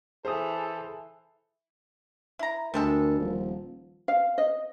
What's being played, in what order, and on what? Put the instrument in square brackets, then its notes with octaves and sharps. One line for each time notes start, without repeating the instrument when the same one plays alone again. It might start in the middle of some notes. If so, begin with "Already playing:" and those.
[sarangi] E3 [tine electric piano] G#4 D#6 [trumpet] A4 [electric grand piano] C5
[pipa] E4 A#5
[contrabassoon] D2 [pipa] G3 G#3 A4 [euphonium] A#4
[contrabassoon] D#1 [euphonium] F3
[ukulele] F5
D#5